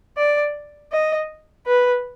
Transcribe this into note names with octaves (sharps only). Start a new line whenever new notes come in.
D5
D#5
B4